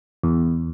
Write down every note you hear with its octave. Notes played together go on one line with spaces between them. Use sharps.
E2